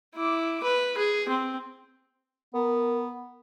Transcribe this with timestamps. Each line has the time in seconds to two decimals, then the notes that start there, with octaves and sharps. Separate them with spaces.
0.15 E4 D6
0.63 B4
0.98 G#4
1.29 C4
2.54 B3 A#4